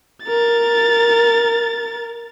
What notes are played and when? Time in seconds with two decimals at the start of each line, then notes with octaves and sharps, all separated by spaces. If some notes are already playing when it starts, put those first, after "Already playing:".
0.24 A#4 A6